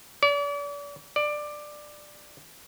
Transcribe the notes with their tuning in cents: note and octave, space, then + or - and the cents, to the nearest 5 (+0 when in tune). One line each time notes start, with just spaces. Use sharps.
D5 -40
D5 +15